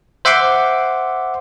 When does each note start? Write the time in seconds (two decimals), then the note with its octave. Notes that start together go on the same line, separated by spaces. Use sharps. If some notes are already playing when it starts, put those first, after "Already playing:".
0.25 C5 E5 F#5 C6 D6